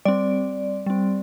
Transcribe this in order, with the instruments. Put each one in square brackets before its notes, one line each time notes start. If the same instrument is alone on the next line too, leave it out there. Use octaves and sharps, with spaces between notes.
[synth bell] G3 C4 D5
G3 C4